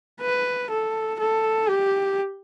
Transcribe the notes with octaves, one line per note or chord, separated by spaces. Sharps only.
B4
A4
A4
G4